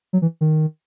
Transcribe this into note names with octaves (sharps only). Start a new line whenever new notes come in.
F#3
E3
D#3